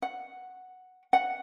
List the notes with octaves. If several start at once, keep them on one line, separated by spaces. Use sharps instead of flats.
F#5
F#5